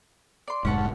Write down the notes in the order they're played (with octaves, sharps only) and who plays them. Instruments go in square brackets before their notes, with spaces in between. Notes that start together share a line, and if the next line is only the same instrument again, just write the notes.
[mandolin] D5 C6
[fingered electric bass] F1 G#2 [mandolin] C#4 F#5 A5